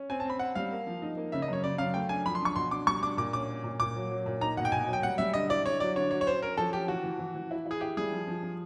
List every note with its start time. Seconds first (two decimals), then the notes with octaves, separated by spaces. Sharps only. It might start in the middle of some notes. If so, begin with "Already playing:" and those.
Already playing: C#4
0.10 C4 G#5
0.20 A5
0.25 C4 B5
0.39 C4 F#5
0.55 G3 F5
0.71 A#3
0.87 F3
1.02 D#4
1.17 A#3
1.32 C#3 E5
1.42 D#5
1.48 F#2 C#5
1.64 C#3 D5
1.78 F#2 F5
1.94 A3 G5
2.09 D4 G#5
2.26 F3 B5
2.35 C6
2.41 D4 C#6
2.56 B2 C6
2.71 D4 D6
2.87 G3 C#6
3.03 D4 D6
3.17 A#2 D6
3.33 C#4 D6
3.49 C#4
3.64 A#2
3.80 A#2 D6
3.96 F#3
4.11 F#3
4.26 A#2
4.41 D#4 A#5
4.57 B2 F#5
4.65 G5
4.72 B2 G#5
4.88 F#3
4.93 G5
5.03 G3 F#5
5.18 G3 E5
5.34 D3 D#5
5.49 E4 D5
5.65 D3 C#5
5.80 F#3 D5
5.96 D3 C#5
6.11 F#3 C#5
6.21 C#5
6.26 C#4 C5
6.42 C#4 A#4
6.57 F3 A4
6.73 C#4 G4
6.88 E3 F#4
7.04 E3
7.19 E3
7.35 E3
7.51 E4
7.66 E4 G#4
7.81 E4 G4
7.97 G3 G#4
8.12 F3
8.28 F3
8.43 F3